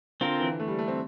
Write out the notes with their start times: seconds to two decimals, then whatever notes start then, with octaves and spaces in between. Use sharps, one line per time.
0.21 D3 C4 F4 A#4
0.41 E3
0.60 A3
0.68 G3
0.79 A3
0.88 C4